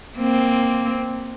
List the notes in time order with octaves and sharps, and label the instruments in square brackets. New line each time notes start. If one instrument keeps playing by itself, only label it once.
[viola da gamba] A#3 C4